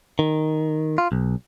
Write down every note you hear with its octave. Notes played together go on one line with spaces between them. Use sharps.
D#3
F4
B1